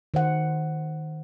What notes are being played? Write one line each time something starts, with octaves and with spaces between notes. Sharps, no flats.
D#3 C5 F#5